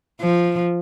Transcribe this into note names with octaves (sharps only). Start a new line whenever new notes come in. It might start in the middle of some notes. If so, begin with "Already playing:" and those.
F3